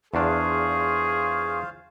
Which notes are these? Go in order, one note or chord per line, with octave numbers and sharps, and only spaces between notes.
E2 D4 F4 G#4 C5 F5 C#6